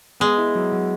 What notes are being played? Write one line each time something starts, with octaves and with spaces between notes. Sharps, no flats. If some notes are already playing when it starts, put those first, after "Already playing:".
G#3 B3
E4
F#3
F#3